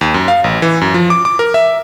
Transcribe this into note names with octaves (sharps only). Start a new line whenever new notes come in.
D#2
F#2
F5
A1
E3
F#2
F3
D6
D6
A#4
E5